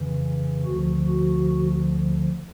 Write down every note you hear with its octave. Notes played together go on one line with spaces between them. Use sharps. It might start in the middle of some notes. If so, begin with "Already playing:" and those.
Already playing: F2 C#3 E3
D2 D3 F3 F#4
F#4